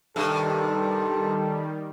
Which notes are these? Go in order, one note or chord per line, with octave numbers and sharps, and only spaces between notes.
G2 C3 D#3 G3 A4